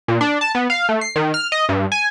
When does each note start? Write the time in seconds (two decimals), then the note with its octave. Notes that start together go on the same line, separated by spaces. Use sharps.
0.08 A#2
0.21 D4
0.41 A5
0.55 B3
0.70 F5
0.89 A3
1.01 C7
1.16 D#3
1.34 F6
1.52 D#5
1.69 G2
1.92 G#5